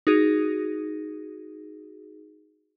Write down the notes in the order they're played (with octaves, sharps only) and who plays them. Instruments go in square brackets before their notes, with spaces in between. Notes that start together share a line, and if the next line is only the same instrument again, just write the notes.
[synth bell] D#4 F#4 G#4